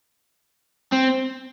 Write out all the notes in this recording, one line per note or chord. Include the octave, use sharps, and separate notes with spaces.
C4